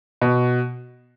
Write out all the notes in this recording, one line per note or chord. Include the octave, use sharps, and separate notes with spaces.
B2